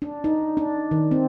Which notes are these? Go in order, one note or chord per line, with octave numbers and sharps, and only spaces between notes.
D4
D#4
D4
D#3
C4